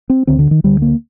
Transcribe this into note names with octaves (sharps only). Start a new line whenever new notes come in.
C4
D2 D3 C4
D3
D#3
D2 D3 G3
A#3